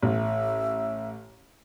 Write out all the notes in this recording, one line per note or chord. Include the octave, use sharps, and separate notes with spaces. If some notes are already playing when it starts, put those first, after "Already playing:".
A1 E5